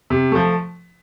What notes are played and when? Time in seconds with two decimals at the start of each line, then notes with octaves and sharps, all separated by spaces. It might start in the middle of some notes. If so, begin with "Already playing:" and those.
0.10 C3
0.32 F3 A3